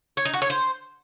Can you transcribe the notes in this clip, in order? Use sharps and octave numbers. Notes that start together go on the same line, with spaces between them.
C#5
D#4
F#4
C#5
C5